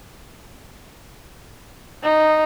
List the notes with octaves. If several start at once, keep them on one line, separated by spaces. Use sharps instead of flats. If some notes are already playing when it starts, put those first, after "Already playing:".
D#4